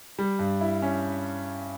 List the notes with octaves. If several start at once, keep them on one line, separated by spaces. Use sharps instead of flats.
G3
G2
E4
C#4